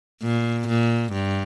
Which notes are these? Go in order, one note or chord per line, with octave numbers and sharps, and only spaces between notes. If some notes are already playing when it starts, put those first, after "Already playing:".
A#2
A#2
G2